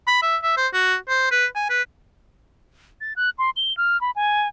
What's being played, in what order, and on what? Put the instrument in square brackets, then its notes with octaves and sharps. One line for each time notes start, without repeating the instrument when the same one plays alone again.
[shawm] B5
E5
E5
C5
F#4
C5
B4
G#5
B4
[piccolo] A6
F#6
C6
G7
F6
B5
G#5